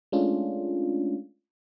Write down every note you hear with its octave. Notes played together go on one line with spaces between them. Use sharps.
G#3 A3 C#4 D4 F4